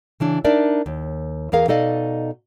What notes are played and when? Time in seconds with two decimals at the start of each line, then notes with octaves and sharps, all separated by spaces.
0.20 C#3 E3 D4
0.44 D4 D#4 A#4 D5 E5
0.86 D#2
1.52 E2 E3 G#4 A#4 F5
1.68 B2 D#4 A4 D5 D#5 F5